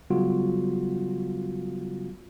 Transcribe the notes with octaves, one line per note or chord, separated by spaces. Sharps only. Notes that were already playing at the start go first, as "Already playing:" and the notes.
C#3 F#3 G3 B3 F4 F#4